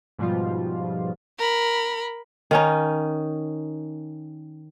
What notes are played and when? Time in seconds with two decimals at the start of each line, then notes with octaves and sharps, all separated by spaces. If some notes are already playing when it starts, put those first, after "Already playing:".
0.19 G#2 B2 F3 G3 F4
1.38 A#4 B5
2.51 D#3 C#4 D#4